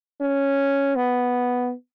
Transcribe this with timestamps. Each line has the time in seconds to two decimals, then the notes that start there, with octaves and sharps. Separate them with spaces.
0.21 C#4
0.95 B3